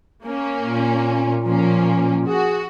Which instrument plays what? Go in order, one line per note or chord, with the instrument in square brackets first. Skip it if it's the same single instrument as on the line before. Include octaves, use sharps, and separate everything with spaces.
[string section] A#3 C#4
[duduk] A#2
[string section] F3 A#3 C#4
[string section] F#4 [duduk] G#4